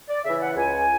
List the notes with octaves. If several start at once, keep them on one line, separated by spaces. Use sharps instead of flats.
D5
C#3 E3 E5
F#5
C#2 G#5